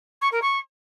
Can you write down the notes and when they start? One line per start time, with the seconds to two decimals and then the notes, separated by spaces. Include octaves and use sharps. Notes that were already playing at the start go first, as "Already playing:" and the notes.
0.21 C#6
0.31 A#4
0.42 C#6